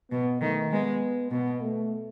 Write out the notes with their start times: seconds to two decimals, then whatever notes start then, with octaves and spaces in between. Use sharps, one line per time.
0.11 B2 B3
0.41 D#3 A3
0.71 G#3 B3
1.31 B2 B3
1.61 A3